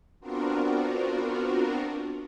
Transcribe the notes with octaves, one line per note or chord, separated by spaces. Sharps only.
B3 C4 D4 F4 F#4 A#4